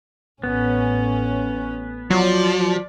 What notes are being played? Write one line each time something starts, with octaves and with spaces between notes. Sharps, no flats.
A1 B3 C#4
F3 F#3 D5